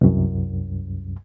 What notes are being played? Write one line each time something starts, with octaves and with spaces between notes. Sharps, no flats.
C2 F#2